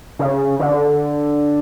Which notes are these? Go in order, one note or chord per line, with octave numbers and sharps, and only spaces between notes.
C#3
D3